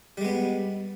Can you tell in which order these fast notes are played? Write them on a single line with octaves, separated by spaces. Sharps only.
G3 G#3 B3